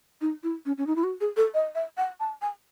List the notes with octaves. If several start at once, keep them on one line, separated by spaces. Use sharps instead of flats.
D#4
E4
C#4
C#4
D#4
E4
F#4
G#4
A4
D#5
E5
F#5
A5
G#5